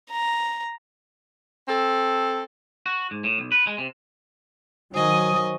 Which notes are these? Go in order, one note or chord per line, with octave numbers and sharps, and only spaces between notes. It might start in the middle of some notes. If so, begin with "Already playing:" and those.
A#5
C4 A4
F#4
G#2
A2
B1
B4
G#3
C3
D#3 F#3 C5 D#5 G#5 C#6 D#6